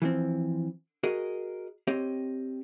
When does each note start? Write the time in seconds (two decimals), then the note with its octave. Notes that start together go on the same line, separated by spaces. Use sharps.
0.02 E3 F3 C4
1.03 F#4 G#4 A#4 D#5
1.87 C4 G4 C#5 D#5